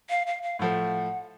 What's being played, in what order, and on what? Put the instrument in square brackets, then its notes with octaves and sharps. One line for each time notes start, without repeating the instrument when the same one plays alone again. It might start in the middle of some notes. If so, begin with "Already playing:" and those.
[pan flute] F5
F5
F5
[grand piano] A2 F3 A3 [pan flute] F#5